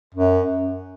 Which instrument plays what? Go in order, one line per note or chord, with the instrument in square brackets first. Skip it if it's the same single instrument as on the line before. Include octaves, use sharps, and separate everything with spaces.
[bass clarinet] F#2